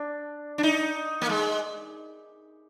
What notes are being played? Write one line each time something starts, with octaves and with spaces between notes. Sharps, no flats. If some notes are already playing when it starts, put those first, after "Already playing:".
Already playing: D4
D4
D#4
A#3
G#3